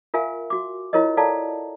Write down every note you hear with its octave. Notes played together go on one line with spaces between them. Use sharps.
F4 A#4 E5 F5 G#5
F#4 D6
E4 F4 A#4 C#5 D#5
A4 D5 F5 A5 A#5